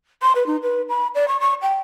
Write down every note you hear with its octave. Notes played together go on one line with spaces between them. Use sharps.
C6
B4
D#4
B4
B5
D5
C#6
C#6
G5